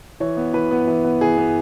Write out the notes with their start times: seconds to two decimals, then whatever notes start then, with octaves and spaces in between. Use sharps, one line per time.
0.20 E3 C#5
0.37 B3
0.53 E3 B4
0.71 B3
0.87 E3
1.04 B3
1.21 E3 G#4
1.38 B3